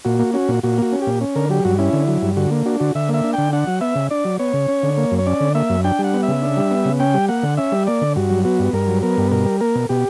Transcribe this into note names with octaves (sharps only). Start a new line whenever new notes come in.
A#2 F#4
A#3
C#4 F#4
A#2
A#2 F#4
A#3 F#4
C#4
A#2 G4
C#4
D3 A#4
F#3 G4
G2 F#4
C#4 E4
D3
F#3
G2
D3 F#4
A#3
D4 F#4
D3 F#4
D3 E5
A#3 E5
D4
D3 G5
D4 F#5
F#3
B3 E5
C#3
D4 D5
F#3
B3 C#5
C#3
C#4
D3
A#3
F#2
C#5
C#4 D5
D3
A#3 E5
F#2
D4 G5
G3
F#5
B3
E5
C#3
D4
G3
B3
C#3
C#4 G5
G3
A#3 F#5
D3
C#4 E5
G3
A#3 D5
D3
G2 F#4
F#3
B3 F#4
G2
G2 A#4
F#3
B3 A#4
G2
B2 A#4
G3
A#3 A#4
B2
B2 G4